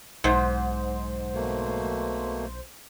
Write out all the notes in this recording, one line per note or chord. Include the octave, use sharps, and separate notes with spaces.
B1 G#2 C5
B2 A3 A#3